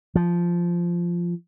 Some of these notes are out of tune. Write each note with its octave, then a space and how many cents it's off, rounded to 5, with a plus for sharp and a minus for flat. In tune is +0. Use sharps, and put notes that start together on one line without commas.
F3 -10